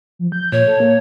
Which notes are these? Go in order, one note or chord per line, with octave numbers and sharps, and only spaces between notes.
F3
G6
A#2 C#5
A4
A#3